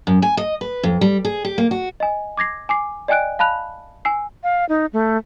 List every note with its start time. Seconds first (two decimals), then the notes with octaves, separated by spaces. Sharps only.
0.07 F#2
0.22 G#5
0.37 D#5
0.61 B4
0.83 F2
1.01 G3
1.25 G#4
1.45 G4
1.58 A#3
1.71 F#4
2.00 D#5 G#5
2.37 D6 G#6 A#6 C7
2.69 G#5 D6 C7
3.08 D5 D#5 G5 G#5 F#6 D7
3.39 F5 A5 B5 F#6 F7
4.05 G#5 E6 C7
4.43 F5
4.69 D#4
4.93 A3